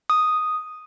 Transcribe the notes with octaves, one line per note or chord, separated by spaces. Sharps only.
D#6